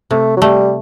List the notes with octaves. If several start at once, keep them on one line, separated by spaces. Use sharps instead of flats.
C3 A3
F#3
G3 A3